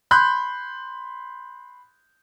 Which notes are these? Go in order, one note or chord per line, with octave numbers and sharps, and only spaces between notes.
B5 C6 F#6 G6